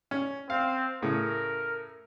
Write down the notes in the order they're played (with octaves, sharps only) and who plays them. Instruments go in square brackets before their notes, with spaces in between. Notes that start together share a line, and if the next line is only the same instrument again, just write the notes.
[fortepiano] C#4
[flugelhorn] C4 [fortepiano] F5
[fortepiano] A2 C#3 [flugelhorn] A#4